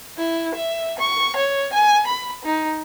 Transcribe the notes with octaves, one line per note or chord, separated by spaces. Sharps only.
E4
E5
C#6
C#5
G#5
B5
D#4